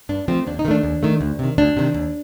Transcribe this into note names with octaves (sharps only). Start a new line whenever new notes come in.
G2 D4
F3 A3 C4
D#2 D4
D#4
D#3 A3 C4 D4
D#2
D#3 A3
D2
C3 D#3
D2 D4
C3 D#3
D#2